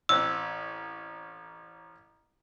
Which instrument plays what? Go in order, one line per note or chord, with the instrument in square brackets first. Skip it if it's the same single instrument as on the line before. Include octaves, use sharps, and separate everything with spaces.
[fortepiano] A1 C4 F#6 [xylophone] E6